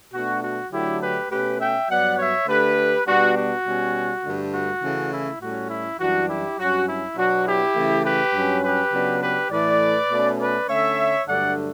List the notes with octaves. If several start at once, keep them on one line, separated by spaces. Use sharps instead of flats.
B2 A3 D4 F#4
F#4
D3 F#3 A3 D4 E4 G4
G4 B4
B2 A3 C#4 G4 B4
E5 G5
G2 F#3 B3 D5 F#5
C#5 E5
D3 A3 D4 G4 B4
B2 G3 B3 D4 F#4
F#4
B2 G3 C#4
G2 D3 A3
F#4
C#3 E3 A3 C#4
E4
A2 G3 C#4 F#4
E4
F#2 E3 G3 D4 F#4
E4 G4
G2 F#3 C#4 F#4
E4
B2 F#3 B3 D4 F#4
E4 G4
C#3 E3 A3
G4 B4
G2 F#3 C#4
G4 B4
C#3 F#3 B3 D4
G4 B4
A2 E3 A3 B4 D5
B2 A3 C#4
B4 D5
D3 A3 C#4 C#5 E5
G2 D3 F#3 A3 D4 D5 F#5